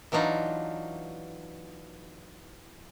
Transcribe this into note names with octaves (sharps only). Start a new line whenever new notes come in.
E3 F#3 D4 D#4 F4